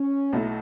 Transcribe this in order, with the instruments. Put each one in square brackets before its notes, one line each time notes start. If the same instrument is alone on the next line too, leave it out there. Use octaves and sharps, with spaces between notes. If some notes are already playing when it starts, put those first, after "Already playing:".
Already playing: [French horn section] C#4
[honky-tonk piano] B1 B2 A3 E4